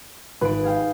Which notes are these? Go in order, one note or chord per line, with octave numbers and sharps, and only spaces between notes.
G#1 B4 D7
G#4 F5 G5